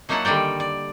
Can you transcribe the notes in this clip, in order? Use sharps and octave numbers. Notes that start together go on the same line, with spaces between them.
F#3 A#3 D#4 E4 F#5 A5
D3 D#3 G3 D5 G5
D5